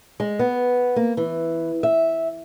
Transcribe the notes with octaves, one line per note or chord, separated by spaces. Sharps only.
G#3
B3
A#3
E3
E5